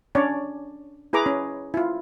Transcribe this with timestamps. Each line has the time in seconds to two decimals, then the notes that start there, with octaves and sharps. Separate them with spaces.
0.15 C#4 D4 C#5 D5
1.13 E4 G#4 B4 A#5 D6
1.26 C#4
1.74 E4 F4